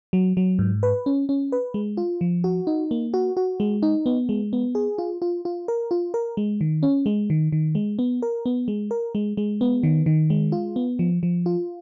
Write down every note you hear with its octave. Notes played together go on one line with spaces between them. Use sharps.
F#3
F#3
G#2
B4
C#4
C#4
B4
G#3
F4
F3
F#4
D#4
A#3
F#4
F#4
G#3
D#4
B3
G#3
B3
G#4
F4
F4
F4
A#4
F4
A#4
G#3
D#3
C#4
G#3
D#3
D#3
G#3
B3
A#4
B3
G#3
A#4
G#3
G#3
B3
D#3
D#3
G#3
F4
B3
F3
F3
F4